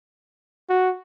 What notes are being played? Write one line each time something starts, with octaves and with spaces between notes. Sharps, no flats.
F#4